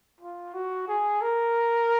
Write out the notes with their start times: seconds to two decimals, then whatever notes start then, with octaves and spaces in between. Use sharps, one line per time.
0.21 F4
0.54 F#4
0.88 G#4
1.22 A#4